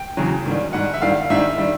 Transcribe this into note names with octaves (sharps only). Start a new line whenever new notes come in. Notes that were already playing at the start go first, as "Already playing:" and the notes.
Already playing: G5
E2 C#3 F#3
G#2 D#3 G3
G#2 D#3 G3 F#5
E5
G#2 D#3 G3 F5
F5
G#2 D#3 G3 E5
D#3 G3